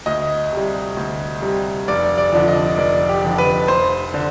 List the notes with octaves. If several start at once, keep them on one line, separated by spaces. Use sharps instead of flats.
D2 D#5
C3 G3
D2
C3 G3
F1 D5
D5
F2 D3 F3
D#5
F1 D5
G4
F2 D3 F3
B4
F1 C5
D3